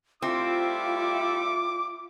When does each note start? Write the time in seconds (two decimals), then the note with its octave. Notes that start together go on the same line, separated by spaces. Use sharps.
0.22 G3 A3 C4 E4 F4 D6